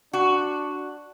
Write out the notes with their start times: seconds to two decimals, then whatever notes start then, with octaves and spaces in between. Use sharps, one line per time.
0.13 D4 F#4